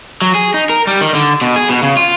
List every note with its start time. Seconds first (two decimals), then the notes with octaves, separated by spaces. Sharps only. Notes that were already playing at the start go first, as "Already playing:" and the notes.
0.22 F#3
0.35 G#4
0.54 D#4
0.69 A#4
0.87 G3
1.01 D#3
1.15 D3
1.42 B2
1.56 G#4
1.69 B2
1.83 C#3
1.97 F4